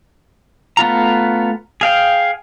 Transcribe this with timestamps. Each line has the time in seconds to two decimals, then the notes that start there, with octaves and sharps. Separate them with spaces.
0.77 A3 B3 F4 A#5
1.81 G#4 F5 G5